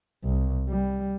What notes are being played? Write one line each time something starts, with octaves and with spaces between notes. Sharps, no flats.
C2
G3